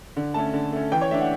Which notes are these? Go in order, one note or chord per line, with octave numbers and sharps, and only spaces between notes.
D3
A3 C#4 A5
D3
A3 C#4
E3 G5
C#5
A3 D4 E5
F#5